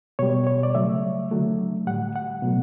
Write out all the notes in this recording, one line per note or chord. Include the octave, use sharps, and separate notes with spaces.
B2 G3 C#5
C#5
D5
C#3 F#3 A3 E5
D3 F#3 A3
A2 G3 F#5
F#5
B2 F#3 A3